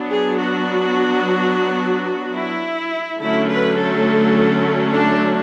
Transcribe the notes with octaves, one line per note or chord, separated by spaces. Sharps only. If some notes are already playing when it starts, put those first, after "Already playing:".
Already playing: F#3 B3 D4
G#4
F#4
E4
D3 F#3 A3 C#4 E4
B4
A4
D4